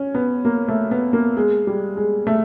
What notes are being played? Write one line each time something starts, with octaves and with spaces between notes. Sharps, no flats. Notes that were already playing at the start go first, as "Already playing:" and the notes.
Already playing: C#4
B3
A#3
A3
B3
A#3
G#3
G3
G#3
A3